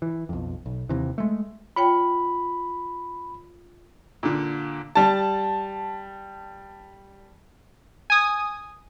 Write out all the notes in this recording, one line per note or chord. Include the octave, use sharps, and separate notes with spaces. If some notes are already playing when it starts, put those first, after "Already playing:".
E3
B1 F2
B1
D#2 C3 E3
G#3 A3
F4 C#5 G5 B5
A#2 D3
G3 A5
G#5 D#6